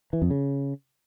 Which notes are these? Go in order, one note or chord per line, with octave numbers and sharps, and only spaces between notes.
E3
F2
C#3